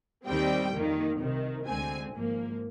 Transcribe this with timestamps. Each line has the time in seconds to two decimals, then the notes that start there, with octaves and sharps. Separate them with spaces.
0.25 D#2 D#3 G3 C4 G5
0.72 F2 D#3 A#3
1.20 C2 C3 D#3
1.67 D2 D3 G#3 C4 G#5
2.14 G#1 G#2 F3 A#3